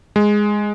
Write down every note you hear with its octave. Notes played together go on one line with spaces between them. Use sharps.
G#3